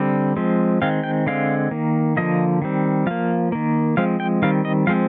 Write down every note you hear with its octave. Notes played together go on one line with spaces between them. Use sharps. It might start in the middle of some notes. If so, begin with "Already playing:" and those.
Already playing: D3 G3 C4
F3 G#3 C4
D#3 G#3 C4 F5
G5
D3 G#3 C4 F5
D#3 A#3
D3 F3 A#3 D#5
D#3 G3 C4
F3 A#3 F5
D#3 A#3
F3 G#3 C4 F5
G5
D#3 G3 C4 F5
D#5
F3 G#3 C4 F5